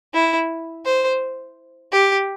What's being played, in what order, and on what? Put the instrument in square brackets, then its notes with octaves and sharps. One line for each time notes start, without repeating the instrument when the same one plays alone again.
[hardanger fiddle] E4
C5
G4